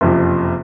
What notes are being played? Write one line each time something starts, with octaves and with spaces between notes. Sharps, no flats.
F#1 F2 C3 F3